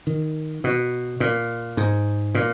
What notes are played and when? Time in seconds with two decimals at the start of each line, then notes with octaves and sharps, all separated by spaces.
0.07 D#3
0.64 B2
1.20 A#2
1.77 G#2
2.35 A#2